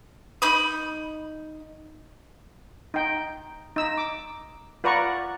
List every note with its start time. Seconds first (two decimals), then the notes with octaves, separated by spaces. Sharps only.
0.42 D#4 B5 D#6
2.94 D#4 G5
3.76 D#4 E6
3.97 D6
4.84 F4 B4 D5 F#5 A#5 C#6